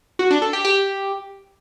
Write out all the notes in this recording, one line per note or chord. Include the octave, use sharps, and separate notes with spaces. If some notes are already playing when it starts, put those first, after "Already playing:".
F#4
D4
A4
G4
G4